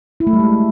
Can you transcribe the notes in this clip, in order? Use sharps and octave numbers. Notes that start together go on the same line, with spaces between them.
E4
A3
G3
G#3